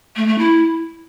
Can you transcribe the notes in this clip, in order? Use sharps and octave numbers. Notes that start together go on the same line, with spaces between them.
A3
A3
E4